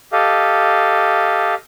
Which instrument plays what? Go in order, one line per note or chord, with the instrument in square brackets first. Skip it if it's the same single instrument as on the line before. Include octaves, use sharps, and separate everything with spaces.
[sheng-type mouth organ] G4 A4 D#5 F5